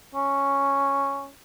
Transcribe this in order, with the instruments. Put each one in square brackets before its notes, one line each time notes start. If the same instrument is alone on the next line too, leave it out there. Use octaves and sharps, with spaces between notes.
[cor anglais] C#4